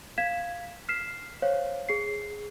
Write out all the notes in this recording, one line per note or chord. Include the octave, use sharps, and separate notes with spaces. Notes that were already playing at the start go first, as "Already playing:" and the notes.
F5 G#6 B6 E7
F6 B6 C7 E7
C5 C#5 F5
G#4 C7